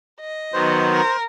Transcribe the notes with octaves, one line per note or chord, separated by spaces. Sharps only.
D#5
D#3 F#3 B3 C5
A#4